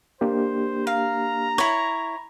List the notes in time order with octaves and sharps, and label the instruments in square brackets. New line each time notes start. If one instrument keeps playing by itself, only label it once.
[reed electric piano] A#3 D4 G4 [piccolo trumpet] C5
[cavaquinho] F5 [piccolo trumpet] A#5
[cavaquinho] E4 C#5